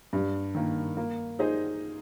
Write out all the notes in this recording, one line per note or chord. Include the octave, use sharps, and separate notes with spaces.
G2
D#3 A#3
A#3
D#4 G#4 C5 D#5